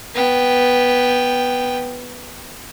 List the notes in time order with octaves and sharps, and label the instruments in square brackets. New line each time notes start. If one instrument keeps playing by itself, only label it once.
[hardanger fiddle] B3 G5